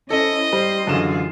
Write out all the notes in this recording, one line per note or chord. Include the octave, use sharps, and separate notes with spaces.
C#4 E4 A4 C5 D#5
G3 C5
F#2 D3 E3 F4 G#4 E7